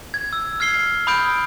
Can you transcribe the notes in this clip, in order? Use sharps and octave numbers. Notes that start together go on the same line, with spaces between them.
G#6
E6
F6 G#6 C7 G7
B5 D#6 G6 D7